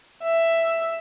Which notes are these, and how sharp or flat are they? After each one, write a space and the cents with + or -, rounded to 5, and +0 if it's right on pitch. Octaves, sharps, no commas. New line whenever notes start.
E5 +5